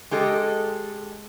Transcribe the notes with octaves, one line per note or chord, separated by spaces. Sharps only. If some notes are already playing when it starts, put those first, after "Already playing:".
G#3 G4 A4 D#5